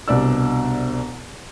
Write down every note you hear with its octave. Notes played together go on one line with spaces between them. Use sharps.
C2 B2 D4 D5 E6